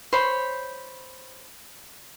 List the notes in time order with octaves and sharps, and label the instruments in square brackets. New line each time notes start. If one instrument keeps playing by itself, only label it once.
[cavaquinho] C5 C#5 B5 C6